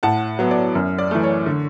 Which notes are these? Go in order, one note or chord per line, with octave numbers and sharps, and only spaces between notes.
A2 F#5 A5
F#3 B3
D5
F#2
D5
E3 A3
C#5
D3